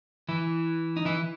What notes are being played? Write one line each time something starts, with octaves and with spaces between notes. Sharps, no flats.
E3 E4
D#4
E3 E4